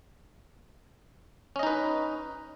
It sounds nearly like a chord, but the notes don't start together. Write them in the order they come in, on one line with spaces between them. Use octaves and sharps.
C#4 D#5 D#4 B4